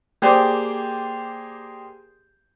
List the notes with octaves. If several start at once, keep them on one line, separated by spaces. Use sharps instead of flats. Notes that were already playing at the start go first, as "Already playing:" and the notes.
A#3 G4 G#4 C5 D5